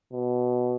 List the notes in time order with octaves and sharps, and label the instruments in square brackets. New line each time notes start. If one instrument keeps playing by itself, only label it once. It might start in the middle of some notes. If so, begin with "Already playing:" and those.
[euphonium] B2